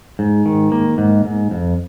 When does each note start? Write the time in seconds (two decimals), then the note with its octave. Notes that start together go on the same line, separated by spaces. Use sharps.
0.19 G#2
0.46 D#3
0.72 A#3
0.98 G#2
1.25 G#2
1.51 F2